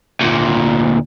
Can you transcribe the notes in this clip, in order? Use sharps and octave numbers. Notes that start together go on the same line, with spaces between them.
D2 A#2